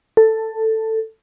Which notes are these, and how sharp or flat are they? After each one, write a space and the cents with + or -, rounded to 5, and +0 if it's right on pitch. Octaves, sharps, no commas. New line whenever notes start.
A4 +10